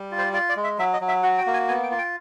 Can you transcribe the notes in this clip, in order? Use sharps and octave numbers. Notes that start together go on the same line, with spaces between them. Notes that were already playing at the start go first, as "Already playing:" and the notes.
Already playing: G3
F4
C5
F4 D5
D5
G#3
E5
F#3 E5
D#5
F#3
E5
F#4 F#5
G5
A#3
G#5
B3 G#5
G5
F4
G5